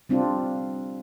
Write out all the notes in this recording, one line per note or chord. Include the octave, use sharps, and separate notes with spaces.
G3 C4 D4 F4